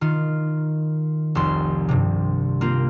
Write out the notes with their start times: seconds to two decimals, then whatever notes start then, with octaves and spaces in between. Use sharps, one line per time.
0.01 D#3 F4
1.35 F1 C2 C6
1.89 G2 C3
2.61 A#3 C4 F4